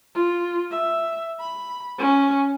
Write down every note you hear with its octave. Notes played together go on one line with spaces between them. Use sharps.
F4
E5
B5
C#4